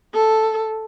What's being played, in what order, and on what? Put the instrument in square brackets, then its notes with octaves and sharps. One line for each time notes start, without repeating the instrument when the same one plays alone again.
[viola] A4